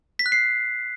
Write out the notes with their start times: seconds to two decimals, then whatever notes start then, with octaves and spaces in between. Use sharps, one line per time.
0.19 B6
0.26 F#6
0.32 C7